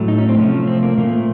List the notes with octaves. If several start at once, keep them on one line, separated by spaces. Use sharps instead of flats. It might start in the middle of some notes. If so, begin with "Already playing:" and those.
Already playing: A2 F#3 A3
D#4
C#4
C4
C3 F3 A3 C#4
C4
A#3
A#2 F3 A3 A#3